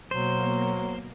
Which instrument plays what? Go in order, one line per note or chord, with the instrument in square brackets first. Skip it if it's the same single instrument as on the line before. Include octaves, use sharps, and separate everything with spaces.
[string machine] B2 A#3 [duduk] F#3 [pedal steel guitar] C5